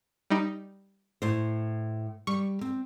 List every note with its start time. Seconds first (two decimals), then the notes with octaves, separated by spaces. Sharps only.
0.30 G3 D#4
1.22 A2 C5
2.27 G3 C#6
2.61 C4